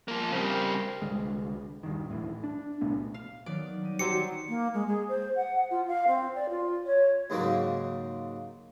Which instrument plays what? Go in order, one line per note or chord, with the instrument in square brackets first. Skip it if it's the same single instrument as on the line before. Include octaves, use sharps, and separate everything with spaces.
[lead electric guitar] F3 A#3
[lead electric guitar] C#3 G3 [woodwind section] C4 A#4 C5
[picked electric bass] C2 D3 G#3
D#1 G2 D#3
D1 A2 E3
D4
C2 A#2 A3 B3
[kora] F5
[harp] D#3 F#3 B3 [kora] D5
[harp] G3 D#4 D#7
[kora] F#3 C4 G4 [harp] C5 D5 D#5 [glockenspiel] C#7
[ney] A#3
G#3
G#4
C5
F#5
F4
F5
C4
D5
F4
C#5
[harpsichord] D#2 G#2 C#3 F#3 A#3